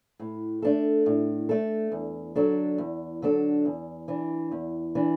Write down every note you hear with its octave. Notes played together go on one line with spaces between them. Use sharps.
A2
A3 D4 A4
A2
A3 D4 A4
E2
D3 F#3 D4 A4
E2
D3 F#3 D4 A4
E2
E3 D4
E2
E3 D4